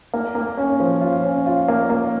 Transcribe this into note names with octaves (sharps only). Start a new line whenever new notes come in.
A#3
A#3
C#4
F3
F4
C#4
F4
A#3
A#3